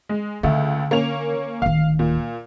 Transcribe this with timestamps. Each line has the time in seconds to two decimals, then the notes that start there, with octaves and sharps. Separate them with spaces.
0.09 G#3
0.43 C#2 D3 A3
0.91 A#3 C#4 F7
1.62 D1 D#3 F5
1.99 A#2